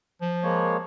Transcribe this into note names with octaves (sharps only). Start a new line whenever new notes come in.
F3
G#3 A#3 C#5